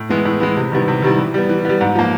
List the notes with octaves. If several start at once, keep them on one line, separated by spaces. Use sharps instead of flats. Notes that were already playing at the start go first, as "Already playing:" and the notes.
Already playing: A2
E3 G#3 B3 E4
A2
E3 G#3 B3 E4
C3
D#3 G3 B3 E4
C3
D#3 G3 B3 E4
E3
G3 B3
E3
G3 B3
G#2
F3 A#3